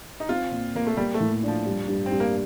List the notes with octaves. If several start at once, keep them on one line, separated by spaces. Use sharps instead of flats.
D#4
C4 F4
A#2
A#2 A#3
A3
G3 A#3
A3
A2
F3 D4
G3
G2
C4
G2
A#3